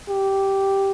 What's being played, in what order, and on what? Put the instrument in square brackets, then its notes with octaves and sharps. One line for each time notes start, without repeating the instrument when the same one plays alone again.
[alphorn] G4